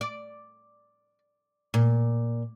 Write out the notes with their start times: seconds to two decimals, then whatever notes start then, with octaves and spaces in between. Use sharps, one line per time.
0.01 D5
1.74 A#2